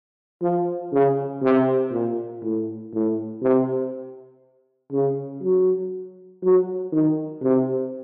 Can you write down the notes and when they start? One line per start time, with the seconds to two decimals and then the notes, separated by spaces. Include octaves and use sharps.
0.42 F3
0.93 C#3
1.42 C3
1.92 A#2
2.43 A2
2.93 A2
3.43 C3
4.92 C#3
5.42 F#3
6.43 F#3
6.92 D#3
7.42 C3